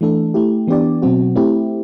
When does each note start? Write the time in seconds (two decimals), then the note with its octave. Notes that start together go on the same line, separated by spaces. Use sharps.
0.01 E3 A3 D4 A4
0.34 A3 E4 G4
0.67 E3 B3 D4 G4 D5
1.02 B2 F#3 C4 F#4
1.36 A3 C4 E4 G4